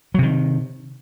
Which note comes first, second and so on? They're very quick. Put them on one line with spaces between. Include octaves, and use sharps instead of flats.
F#3 C3 D#3